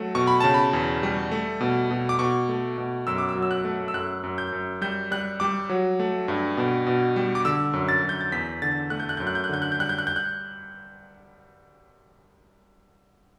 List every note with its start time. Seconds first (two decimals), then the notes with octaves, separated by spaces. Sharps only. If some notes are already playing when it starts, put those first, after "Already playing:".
Already playing: F#3 A3
0.15 B2 C#6
0.27 B5
0.40 C#3 A5
0.54 B5
0.73 E2
1.03 G3
1.32 A3
1.61 B2
1.91 B2
2.09 D6
2.19 B2 C#6
2.49 A3
2.78 B2
3.07 F#2 E6
3.18 D6
3.29 E6
3.35 F#3
3.42 E6
3.51 F#6
3.65 A3
3.88 E6
3.94 F#2 F#6
4.24 F#2
4.38 G6
4.52 F#2
4.81 G3 G6
5.11 G3 F#6
5.40 G3 D6
5.69 F#3
5.99 A3
6.28 G2
6.57 B2
6.87 B2
7.16 G3
7.35 D6
7.45 D3 E6
7.73 F#2
7.89 A6
8.03 F#2
8.09 G6
8.21 A6
8.32 E2 B6
8.62 D3 A6
8.90 A3 F#6
9.00 G6
9.09 F#6
9.17 F#2 G6
9.27 F#6
9.35 G6
9.44 F#6
9.49 D3 G6
9.62 F#6
9.72 G6
9.78 G3 F#6
9.89 G6
9.99 F#6
10.07 G6
10.16 F#6